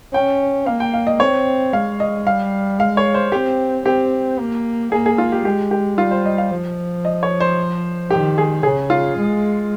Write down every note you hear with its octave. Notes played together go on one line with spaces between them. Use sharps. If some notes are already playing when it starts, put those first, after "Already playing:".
C#4 G5
A#3 F5
G5
F5
D#5
C4 C#5
G#3 F5
D#5
G3 F5
G#3 F5
C#5
C5
C4 G4
C4 G4
A#3
A#3 G#4
G#4
F4
G4
G#3 G4
G4
G3 F4
C5
D#5
F5
F3
D#5
C#5
C5
D#3 G4
G#4
C#3 G#4
F4
G#3